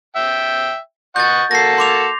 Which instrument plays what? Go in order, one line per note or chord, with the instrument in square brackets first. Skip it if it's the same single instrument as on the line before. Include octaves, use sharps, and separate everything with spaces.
[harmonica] E5 G5
[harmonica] D#5 F#5 C#6 [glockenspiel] G6 A6
[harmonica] A#3 F#4 A4 [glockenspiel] A#6 C7
[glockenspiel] C6 D6 F7